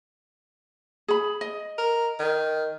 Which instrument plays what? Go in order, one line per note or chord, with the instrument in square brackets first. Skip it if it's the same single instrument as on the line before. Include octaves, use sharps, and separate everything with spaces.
[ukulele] G#4 B5
D#5
[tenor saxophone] A#4
D#3